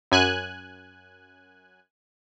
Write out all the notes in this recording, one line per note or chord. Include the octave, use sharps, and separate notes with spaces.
F#2 G#5 F#6